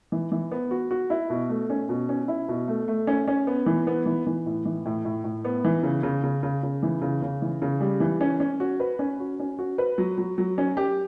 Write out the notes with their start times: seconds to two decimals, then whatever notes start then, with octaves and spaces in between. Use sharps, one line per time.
0.12 E3
0.32 E3
0.51 B3
0.71 F#4
0.91 F#4
1.10 E4
1.30 B2
1.49 A3
1.70 C#4
1.89 B2
2.09 C#4
2.28 E4
2.48 B2
2.68 A3
2.88 A3
3.07 C#4
3.28 C#4
3.47 B3
3.66 E3
3.87 B3
4.06 E3
4.26 E3
4.46 A2
4.65 E3
4.86 A2
5.05 A2
5.24 A2
5.45 B3
5.64 E3
5.83 C#3
6.03 C#3
6.24 C#3
6.43 C#3
6.63 C#3
6.83 E3
7.02 C#3
7.22 C#3
7.42 E3
7.62 C#3
7.81 G3
8.00 E3
8.21 C#4
8.40 C#4
8.60 F#4
8.80 B4
8.99 C#4
9.20 F#4
9.39 C#4
9.59 F#4
9.78 B4
9.98 F#3
10.18 F#3
10.38 F#3
10.58 C#4
10.77 G4